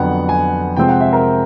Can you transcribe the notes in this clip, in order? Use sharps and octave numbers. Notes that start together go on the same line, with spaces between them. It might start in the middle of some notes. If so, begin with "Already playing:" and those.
Already playing: F2 D3 F#3 B3 F#5
G#5
C3 F3 G#3 C4 G5
F#5
E5
A#4